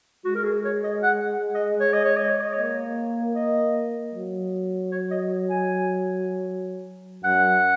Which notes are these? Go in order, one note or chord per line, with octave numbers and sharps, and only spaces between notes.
G#3 F#4
A#4
G#4
C#5
D#5
F#5
D#5
C#5
D#5
C#5
D#5
C#5
D#5
A#3 C#5
D#5
F#3
C#5
D#5
G#5
F#2 F#5